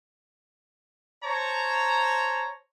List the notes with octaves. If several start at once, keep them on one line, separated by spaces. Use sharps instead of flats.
C5 C#5 A5 A#5